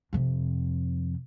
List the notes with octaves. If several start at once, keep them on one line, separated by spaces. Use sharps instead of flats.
F2 C3